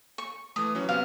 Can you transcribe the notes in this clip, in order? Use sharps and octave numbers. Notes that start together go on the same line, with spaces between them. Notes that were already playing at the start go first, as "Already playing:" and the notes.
C#6
E3 A3 D#6
E3 F#3 C#4
C3 B3 C#4 F5